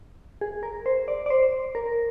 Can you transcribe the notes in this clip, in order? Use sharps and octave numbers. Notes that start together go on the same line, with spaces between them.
G#4
A#4
C5
D5
D5
C5
A#4